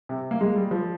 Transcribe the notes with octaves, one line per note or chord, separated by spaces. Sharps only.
C3
A#3
G#3
G3
F3